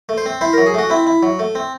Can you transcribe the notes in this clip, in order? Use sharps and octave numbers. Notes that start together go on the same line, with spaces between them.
A3
C5
C4
E4 C5
F#3 A#4
G#4
A3 F#4
C4 E4
E4
F#3
A3
C4